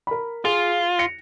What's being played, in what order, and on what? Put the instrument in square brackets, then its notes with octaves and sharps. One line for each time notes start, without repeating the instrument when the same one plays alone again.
[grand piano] A#4 B5
[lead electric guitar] F4 [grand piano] G#4
[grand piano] A#6 C#7